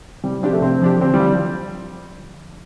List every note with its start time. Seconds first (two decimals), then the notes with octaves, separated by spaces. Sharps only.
0.24 C3 G3
0.43 F3 C4 D4 G4
0.53 A3
0.62 C3 C4
0.82 F3 D4 G4
1.01 D3 C4
1.14 G3
1.20 F3